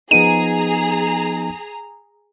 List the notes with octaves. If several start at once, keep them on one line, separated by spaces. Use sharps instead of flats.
F3 B3 D#4 G#4 A#5 D#7